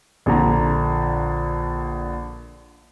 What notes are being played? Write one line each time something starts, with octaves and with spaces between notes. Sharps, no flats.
A#1 D3 A#5